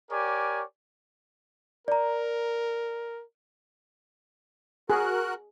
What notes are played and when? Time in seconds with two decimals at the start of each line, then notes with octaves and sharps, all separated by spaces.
0.11 G4 A#4 C#5 D5 G#5
1.88 A#4 D5 A#5
4.90 F#4 G#4 A#4 F#6